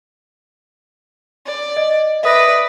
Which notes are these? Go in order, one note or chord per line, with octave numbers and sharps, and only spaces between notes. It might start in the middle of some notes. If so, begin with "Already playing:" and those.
D5
D#5
B4 D5 E5 D#6 A#6